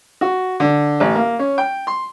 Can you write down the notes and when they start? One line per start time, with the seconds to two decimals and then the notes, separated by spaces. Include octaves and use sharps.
0.21 F#4
0.60 D3
1.00 A1
1.15 A#3
1.39 C#4
1.58 G5
1.87 C6